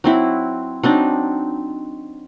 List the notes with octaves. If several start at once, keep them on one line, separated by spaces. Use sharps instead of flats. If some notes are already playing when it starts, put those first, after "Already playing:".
F#3 C4 E4 F#4
F#3 C4 D4 D#4